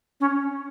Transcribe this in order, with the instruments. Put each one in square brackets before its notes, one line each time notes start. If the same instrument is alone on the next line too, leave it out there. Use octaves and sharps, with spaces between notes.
[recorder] C#4